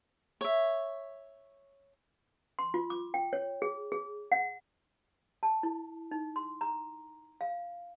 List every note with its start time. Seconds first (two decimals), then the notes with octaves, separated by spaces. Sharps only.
0.41 C#5 E5
2.59 C6
2.74 F4
2.90 D6
3.14 G5
3.33 C#5
3.62 G#4
3.92 G#4
4.32 F#5
5.43 A5
5.63 E4
6.11 D#4
6.36 C6
6.61 A#5
7.41 F5